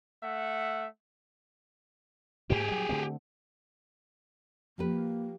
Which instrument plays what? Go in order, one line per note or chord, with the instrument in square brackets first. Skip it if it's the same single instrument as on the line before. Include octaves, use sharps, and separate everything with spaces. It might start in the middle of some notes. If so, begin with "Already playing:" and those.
[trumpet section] A3 E5 F#5
[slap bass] G#2 A#3 [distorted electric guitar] G4 G#4
[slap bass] F#3 G3
D3 A3 C4
[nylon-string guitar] F3 G4 B4 [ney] A#3